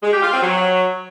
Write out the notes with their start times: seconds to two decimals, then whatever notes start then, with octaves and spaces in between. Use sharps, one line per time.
0.02 G#3
0.12 G4
0.22 F4
0.32 C4
0.42 F#3